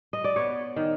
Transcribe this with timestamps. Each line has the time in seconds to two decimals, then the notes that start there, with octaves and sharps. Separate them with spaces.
0.13 D#5
0.24 D5
0.36 B3 C#5
0.76 D#3